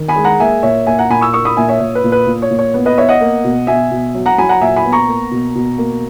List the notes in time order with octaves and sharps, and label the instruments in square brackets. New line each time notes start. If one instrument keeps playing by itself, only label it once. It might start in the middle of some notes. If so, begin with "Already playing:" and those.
Already playing: [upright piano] D#3
G#5 B5
G#3
F#5 A#5
A#3 E5 G#5
A#2 C#5 E5
A#3 E5 G#5
F#5 A#5
A#2 G#5 B5
C#6 E6
A#3 C#6 E6
B5 D#6
A#2 E5 G#5
C#5 E5
A#2 C#5
B4
A#2
B4
A#2
C#5
A#2
C#5
B3
B4 D#5
B3 C#5 E5
D#5 F#5
A#3
B2
B2 E5 G#5
B2
F#3
F#5 A#5
F#3 G#5 B5
F#5 A#5
A#2 E5 G#5
G#5 B5
B3
A#5 C#6
A#3
B2
B2
A#3